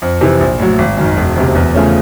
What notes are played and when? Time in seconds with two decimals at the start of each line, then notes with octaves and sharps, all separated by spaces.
0.02 F2
0.21 C3 E3
0.40 A#1
0.59 A2 F#3
0.78 G#1
0.97 F#2 D#3
1.17 E1
1.36 D2 C3
1.55 E2
1.74 C#3 F3 A3 C#4